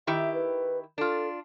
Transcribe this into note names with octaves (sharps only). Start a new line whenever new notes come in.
D#3 E4 G4 E5
B4
D4 F4 A4